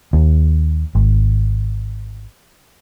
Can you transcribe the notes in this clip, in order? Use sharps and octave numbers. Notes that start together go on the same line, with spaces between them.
D#2
G#1